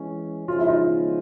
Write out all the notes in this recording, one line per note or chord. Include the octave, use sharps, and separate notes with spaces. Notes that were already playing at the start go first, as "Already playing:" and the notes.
Already playing: E3 G#3 C#4
C#3 F3 G#3 C#4 F4
E4
D#4 F4